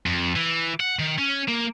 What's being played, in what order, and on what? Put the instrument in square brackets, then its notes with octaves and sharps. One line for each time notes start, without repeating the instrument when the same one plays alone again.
[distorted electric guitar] F2
E3
F#5
D#3
C#4
A#3